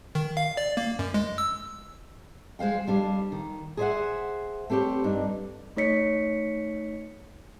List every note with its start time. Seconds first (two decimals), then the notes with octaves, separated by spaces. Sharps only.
0.15 D#3
0.37 F5
0.57 D5
0.77 A#3
0.99 F#2
1.14 G#3
1.38 E6
2.59 G#3 C5 F5 G5
2.87 F2 G3 D4 F5
3.32 D#3
3.77 G#4 A4 C5 D5 E5 F#5
4.70 A3 C4 G4 B4 C#5
5.04 G2 D4 D#4
5.76 A3 D#4 C#5 B6 C#7